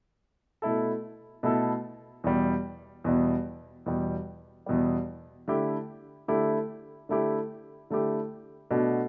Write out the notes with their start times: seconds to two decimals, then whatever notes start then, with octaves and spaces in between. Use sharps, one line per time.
0.62 B2 A3 E4 A4
1.43 B2 A3 E4 A4
2.24 E2 B2 G3
3.04 E2 B2 G3
3.86 E2 B2 G3
4.66 E2 B2 G3
5.48 D3 A3 E4 G4
6.28 D3 A3 E4 G4
7.09 D3 A3 E4 G4
7.90 D3 A3 E4 G4
8.71 B2 A3 D4 F#4